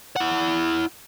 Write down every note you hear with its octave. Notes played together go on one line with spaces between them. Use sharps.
E4 F#5